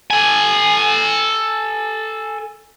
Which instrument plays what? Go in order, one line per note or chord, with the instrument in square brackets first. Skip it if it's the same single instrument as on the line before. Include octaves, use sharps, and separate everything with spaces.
[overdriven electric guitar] A4 G#5